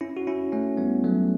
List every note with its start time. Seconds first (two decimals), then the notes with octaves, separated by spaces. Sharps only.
0.01 C#4 E4
0.17 F#4
0.27 C#4 E4
0.52 A3 C#4
0.77 G3 B3
1.04 F#3 A3